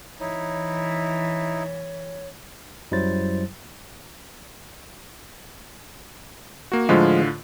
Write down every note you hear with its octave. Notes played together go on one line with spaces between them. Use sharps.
E3 D#4 E4 C#5
F#2 F#3 G3 E4 C5 A6
A#3 F#4
A2 D3 F3 G#3 F4